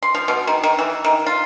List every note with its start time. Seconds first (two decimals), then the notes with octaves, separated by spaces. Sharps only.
0.03 C6
0.15 F3
0.28 B2
0.47 D#3
0.63 D#3
0.79 E3
1.04 D#3
1.26 F4